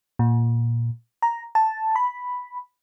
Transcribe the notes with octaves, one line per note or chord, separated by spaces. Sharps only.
A#2
A#5
A5
B5